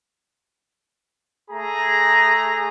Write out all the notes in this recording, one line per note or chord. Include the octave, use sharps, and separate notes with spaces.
A3 G#4 A#5